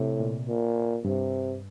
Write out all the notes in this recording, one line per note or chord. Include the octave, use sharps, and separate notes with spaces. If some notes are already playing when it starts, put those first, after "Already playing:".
Already playing: A2 C3
A#2
A#2
G2 C3